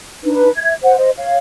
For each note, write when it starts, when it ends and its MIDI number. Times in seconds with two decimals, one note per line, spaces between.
0.24 0.50 62
0.24 0.50 63
0.24 0.50 71
0.56 0.74 76
0.56 0.74 92
0.83 0.96 72
0.83 0.96 78
0.98 1.10 72
0.98 1.10 75
1.18 1.38 73
1.18 1.38 77